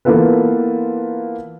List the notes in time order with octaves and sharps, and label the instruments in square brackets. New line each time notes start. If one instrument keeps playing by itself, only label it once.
[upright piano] E3 A#3 B3 F4 A4 B4